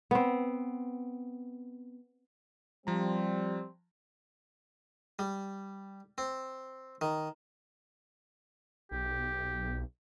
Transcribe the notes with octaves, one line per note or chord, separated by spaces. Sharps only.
B3 C4
F3 G3 C4 A#5
G3
C4
D#3
B1 G4